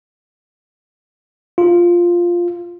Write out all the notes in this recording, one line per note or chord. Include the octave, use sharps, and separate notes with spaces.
F4